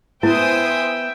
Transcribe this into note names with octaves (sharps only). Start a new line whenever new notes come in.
B3 E4 C5 E5 G5 G#5 D#6